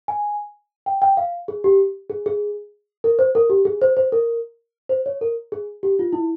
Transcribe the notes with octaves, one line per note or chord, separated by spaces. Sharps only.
G#5
G5
G5
F5
G#4
G4
G#4
G#4
A#4
C5
A#4
G4
G#4
C5
C5
A#4
C5
C#5
A#4
G#4
G4
F4
E4